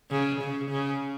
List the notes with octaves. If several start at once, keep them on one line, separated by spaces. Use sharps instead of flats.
C#3
C#3
C#3